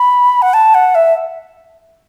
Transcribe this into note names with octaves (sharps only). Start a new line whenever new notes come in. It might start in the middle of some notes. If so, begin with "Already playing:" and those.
Already playing: B5
F#5
A5
F#5
E5